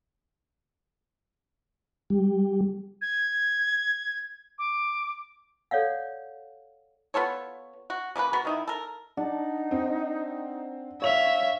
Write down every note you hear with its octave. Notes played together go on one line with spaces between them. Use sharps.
G3
G#6
D6
A4 C#5 D5 F5 F#5
B3 F4 A4 C#5
F#4
C#3 A#3 D4 B4
B3 F#4 A#4
D#3 D#4 E4
A4 A#4
D4 D#4 F#5 A5
C4
C#5 E5 F5 F7